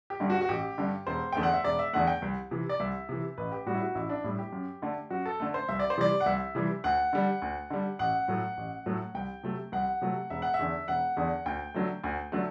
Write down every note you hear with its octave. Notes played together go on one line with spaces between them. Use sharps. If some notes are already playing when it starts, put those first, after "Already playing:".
G4
G2 D3
F#4
F#4
A1 G4
G2 D3
E1 C5
E2 D3 A3 G5
F#5
E5
E1 D5
E5
E2 D3 A3 F#5
G5
C2
C3 E3
D5
C2 E5
C3 E3
A1 B4
G4
A2 G3 F#4
E4
F#4
A1 E4
D4
A2 G3 E4
G4
F#2
D3 A3
F#2 F#4
A4
D3 A3
C5
C2 E5
D5
C5
C3 E3 G3 D5
F#5
C2 E5
C3 E3 G3
D2 F#5
D3 G3
D2
D3 G3
A1 F#5
A2 F#3 A3
A1
A2 F#3 A3
C2 G5
C3 F#3 A3
C2 F#5
C3 F#3 A3
E1 E5
F#5
E5
E2 D3
E1 F#5
E2 D3
D2 G5
D3 F#3 A3
D2
D3 F#3 A3